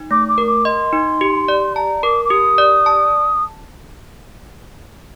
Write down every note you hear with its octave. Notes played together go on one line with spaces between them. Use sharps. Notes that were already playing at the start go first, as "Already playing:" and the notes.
Already playing: D#4
A3 D6
D6
A#4
D6
D#5 C6
D#4
G4
D5
A5 A#5
A#4 D6
D6
G4 D#6
D5
A5